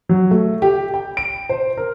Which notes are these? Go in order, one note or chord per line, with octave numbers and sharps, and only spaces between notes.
F#3
A3
G4
G5
D7
C5
A#4